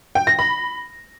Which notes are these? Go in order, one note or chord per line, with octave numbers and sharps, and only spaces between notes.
G5
A#6
B5